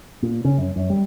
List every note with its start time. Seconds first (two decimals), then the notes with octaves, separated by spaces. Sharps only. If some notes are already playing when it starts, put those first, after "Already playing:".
0.22 A#2
0.45 C#3
0.58 F#2
0.76 F#2
0.90 G3